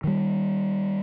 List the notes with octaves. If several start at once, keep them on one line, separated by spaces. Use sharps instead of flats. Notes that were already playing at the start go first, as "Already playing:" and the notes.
D#3 G3